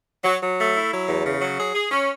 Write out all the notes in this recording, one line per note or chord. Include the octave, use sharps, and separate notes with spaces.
F#3
F#3
A3
E4
F#3
E2
C#3
F#3
G#4
G#4
C#4